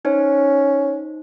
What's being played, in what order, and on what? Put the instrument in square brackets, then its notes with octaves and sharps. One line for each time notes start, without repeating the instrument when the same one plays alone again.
[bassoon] C#4 [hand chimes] D#4 C5